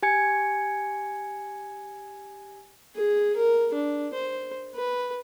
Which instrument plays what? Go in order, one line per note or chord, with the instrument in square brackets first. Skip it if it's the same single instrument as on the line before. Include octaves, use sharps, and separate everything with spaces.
[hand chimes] G4 G#5 G#6 C#7
[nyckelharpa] G#4
A#4
D4
C5
B4